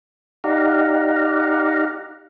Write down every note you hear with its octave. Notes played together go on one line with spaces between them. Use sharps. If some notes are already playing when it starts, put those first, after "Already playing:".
D#4 G4 D5 F5 F#5 A#5